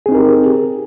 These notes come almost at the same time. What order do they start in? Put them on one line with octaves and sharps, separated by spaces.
G#4 C4 D#4 A#4 G4